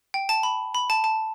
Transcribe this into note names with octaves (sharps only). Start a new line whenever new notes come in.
G5
A5
B5
B5
A5
A5